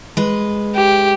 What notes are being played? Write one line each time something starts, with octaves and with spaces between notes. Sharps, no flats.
G#3 B4
G4